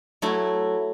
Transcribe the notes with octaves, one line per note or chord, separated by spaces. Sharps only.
F#3 A3 E4